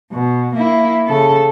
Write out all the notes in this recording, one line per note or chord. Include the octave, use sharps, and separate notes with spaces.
B2
A#3 E4
C#3 A4